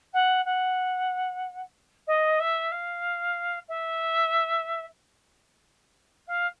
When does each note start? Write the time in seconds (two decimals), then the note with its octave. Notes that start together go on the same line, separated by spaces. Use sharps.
0.13 F#5
0.45 F#5
2.07 D#5
2.39 E5
2.71 F5
3.68 E5
6.27 F5